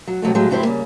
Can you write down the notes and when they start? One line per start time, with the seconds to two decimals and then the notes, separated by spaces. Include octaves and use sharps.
0.07 F#3
0.22 C3 F#3 G3 A3
0.35 A2 F#3 G#3 F4 G4
0.50 D2 G2 F#3 E4 G4 C5
0.63 C#3 G3 A#3